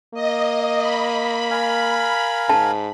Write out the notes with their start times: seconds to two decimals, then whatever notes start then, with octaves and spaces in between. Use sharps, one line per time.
0.14 A#3 D#5
0.78 B5
1.51 A#4 F5 G#5
2.49 G#2 A5